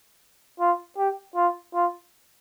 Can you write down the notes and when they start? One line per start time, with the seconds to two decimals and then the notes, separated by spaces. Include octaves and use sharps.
0.60 F4
0.98 G4
1.36 F4
1.75 F4